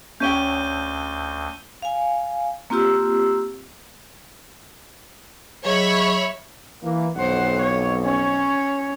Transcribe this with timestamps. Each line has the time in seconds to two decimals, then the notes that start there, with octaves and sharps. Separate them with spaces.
0.20 D2 C#4 C#5 G5 G6 D#7 G7
1.82 F5 G#5
2.70 A#3 C4 F4 G4 E6
5.65 F#3 G#4 C#5 D#5 E5 B5
6.82 E3 A#3
7.17 B1 F2 C5 F#5
7.62 C#5
8.04 C#4 C#5